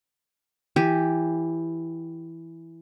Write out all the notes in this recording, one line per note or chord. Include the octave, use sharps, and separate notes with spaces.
E3 G4